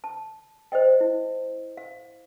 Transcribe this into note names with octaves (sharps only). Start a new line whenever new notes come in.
A5
C5 D5 D#5 G5
E4
F5